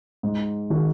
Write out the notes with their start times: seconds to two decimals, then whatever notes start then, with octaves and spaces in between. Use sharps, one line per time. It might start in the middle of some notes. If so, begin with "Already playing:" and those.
0.23 G#2
0.70 D#3 G#3 D#4 F#4